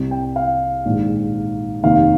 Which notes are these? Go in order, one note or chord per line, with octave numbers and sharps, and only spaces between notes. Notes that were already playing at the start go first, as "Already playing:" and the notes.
Already playing: C2 C3 G3
G5
F5
A#1 G#2 D#3
F1 D#2 D#3 F5